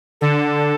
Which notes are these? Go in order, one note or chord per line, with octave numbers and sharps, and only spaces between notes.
D3 A4